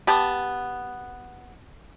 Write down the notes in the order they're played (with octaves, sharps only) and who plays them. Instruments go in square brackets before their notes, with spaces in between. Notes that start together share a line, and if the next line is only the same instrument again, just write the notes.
[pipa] B3 G4 A5